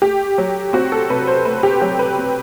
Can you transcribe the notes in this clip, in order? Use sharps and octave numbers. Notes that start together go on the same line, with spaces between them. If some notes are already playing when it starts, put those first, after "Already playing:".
A3 G4
F#3
C4 F#4
A4
C3 B4
C5
A3 B4
G4
F#3 G4
B4
C4